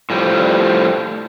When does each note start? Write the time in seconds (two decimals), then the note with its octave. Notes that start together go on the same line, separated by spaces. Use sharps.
0.10 A2 F3 G3